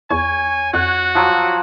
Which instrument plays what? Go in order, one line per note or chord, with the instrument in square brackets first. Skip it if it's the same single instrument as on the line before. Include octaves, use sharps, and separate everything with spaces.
[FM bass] E2 [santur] C#5 [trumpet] G#5
[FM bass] F2 [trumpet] F#4 [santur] F#5
[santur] F3 F#3